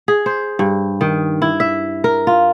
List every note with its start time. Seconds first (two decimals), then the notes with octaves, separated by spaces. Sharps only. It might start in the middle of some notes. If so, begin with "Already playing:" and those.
0.08 G#4
0.26 C5
0.59 G2
1.01 D#3
1.42 E4
1.60 E5
2.04 A#4
2.27 F4